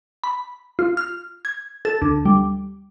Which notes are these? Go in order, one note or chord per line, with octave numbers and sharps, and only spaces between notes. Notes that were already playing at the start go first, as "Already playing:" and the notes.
B5
F4
F6
G#6
A4
D2
G3